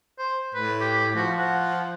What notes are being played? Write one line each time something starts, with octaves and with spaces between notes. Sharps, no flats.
C5
A2 B4
G4
F3 F#4
F#5